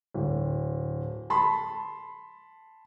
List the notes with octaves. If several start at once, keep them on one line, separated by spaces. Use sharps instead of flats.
D1
A5 B5 C6